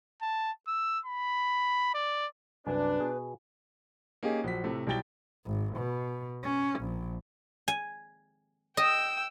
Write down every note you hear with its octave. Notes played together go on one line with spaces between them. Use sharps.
A5
E6
B5
D5
C2 F#2 D4 B4 G#5
B2 G#4
A#3 C#4 D#4 G4 G#4
A#1 F#3 B6
A2 C3 A3
B1 G3 E4 G5 A6 G7
G#1
B2
C#4
A#1
G#5
D#5 G5 E6